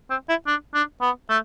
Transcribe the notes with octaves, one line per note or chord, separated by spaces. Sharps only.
C4
E4
D4
D4
B3
A3